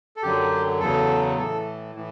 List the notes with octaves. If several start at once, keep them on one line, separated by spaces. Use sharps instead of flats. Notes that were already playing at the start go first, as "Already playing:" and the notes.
A4
F#2 D3 F#3 G4
E2 C#3 F#3 A4
A2 E3 A4
A2 E3